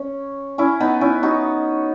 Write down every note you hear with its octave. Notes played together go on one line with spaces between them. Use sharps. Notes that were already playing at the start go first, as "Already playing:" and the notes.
Already playing: C#4
C#4 E4
B3 D#4
C#4 E4
D#4 F#4